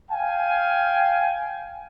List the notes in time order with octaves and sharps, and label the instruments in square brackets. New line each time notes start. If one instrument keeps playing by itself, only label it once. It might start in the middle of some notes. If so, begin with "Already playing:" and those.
[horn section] F5 G5 G#5